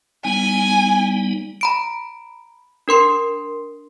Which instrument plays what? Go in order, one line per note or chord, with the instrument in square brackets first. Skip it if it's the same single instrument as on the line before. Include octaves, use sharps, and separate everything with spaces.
[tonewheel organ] G3 B3 D#4 [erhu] G#5
[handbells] A#5 B5 D7
D4 A#4 C6 C7